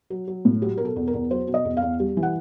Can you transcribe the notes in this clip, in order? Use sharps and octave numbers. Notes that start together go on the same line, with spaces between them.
F#3
F#3
A2
F#3 G4
B2 A#4
A4
E2
A#4
E2
F#3 C5
B2
D#5
E2
F5
E2
G3
E3
F#5